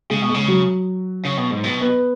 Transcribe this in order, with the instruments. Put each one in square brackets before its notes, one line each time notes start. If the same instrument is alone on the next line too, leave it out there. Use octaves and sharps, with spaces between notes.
[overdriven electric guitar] C#3 [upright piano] G#3 G#4
[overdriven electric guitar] B2
[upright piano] G#3 G#4
[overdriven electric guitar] C#3
[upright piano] F#3 F#4
[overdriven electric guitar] C#3
B2
G#2
B2
[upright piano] B3 B4